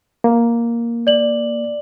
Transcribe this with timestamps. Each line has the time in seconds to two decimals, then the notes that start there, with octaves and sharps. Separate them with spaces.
0.24 A#3
1.07 D5 F#7